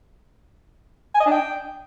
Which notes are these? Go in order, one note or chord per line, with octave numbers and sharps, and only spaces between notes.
G#5
D#5
D4
G5